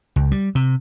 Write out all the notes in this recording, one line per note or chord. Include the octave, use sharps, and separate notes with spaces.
C#2
G3
C3